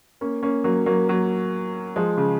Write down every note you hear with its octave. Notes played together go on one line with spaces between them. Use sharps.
A#3 C#4
A#3 C#4
F#3 A#3
F#3 A#3
F#3 A#3
F3 G#3
C#3